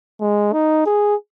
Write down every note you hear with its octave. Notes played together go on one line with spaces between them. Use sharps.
G#3
D#4
G#4